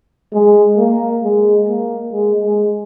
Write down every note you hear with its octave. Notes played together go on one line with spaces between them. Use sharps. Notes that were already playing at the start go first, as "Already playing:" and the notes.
G#3
A#3
G#3
A#3
G#3
G#3